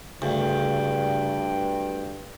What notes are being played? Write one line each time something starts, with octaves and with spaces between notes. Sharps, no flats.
D2 G2 C#3 G5